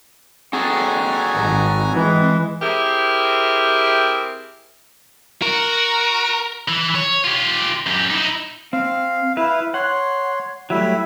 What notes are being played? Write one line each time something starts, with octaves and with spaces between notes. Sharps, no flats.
C4 F#4 G#4 A4 G#5 A#5
G#1
E3 G#3
C4 E4 G4 G#4 A#4
F#4 A#4
E3
C#5
F4 G4
F#2 G4
D#4 E4
C4 F5
E4 B4 E5 F5
C#5 F#5 C6
F#3 G3 A3 E4 E5